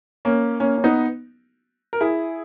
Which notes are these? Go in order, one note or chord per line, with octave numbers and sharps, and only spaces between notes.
A#3 C#4
A#3 C#4
C#4
B3 D#4
A#4
E4 G#4